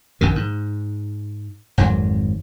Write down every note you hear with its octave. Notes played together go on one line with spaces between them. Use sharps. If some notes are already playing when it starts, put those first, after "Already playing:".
A#1 F#2 D#3
G#2
G#1 F2 G#2 F#3